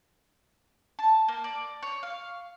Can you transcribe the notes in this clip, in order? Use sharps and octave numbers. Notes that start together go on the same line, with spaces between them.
A5
A#3
D5
C#5
F5